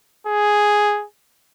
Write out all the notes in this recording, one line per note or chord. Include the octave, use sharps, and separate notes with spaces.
G#4